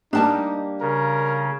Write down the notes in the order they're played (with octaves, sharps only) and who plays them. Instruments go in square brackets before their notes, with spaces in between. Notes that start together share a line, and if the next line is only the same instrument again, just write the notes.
[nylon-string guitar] G3 A#3 G4 [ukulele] D4 A5 [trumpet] D#4
[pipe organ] C#3 [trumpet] A#4